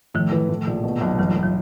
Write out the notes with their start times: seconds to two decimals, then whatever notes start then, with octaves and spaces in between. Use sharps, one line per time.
0.14 A2 D#3 F3
0.32 E3
0.49 A2
0.67 A#1
0.83 B2
1.01 B1
1.18 G1 E3 F#3
1.36 G1
1.43 F#3